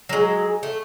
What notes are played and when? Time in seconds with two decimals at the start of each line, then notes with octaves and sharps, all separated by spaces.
0.09 F#3 G#3
0.63 A3